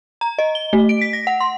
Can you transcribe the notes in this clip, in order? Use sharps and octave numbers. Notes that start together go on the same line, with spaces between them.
A#5
D#5
G7
A3
D7
B6
A#6
F#5
C6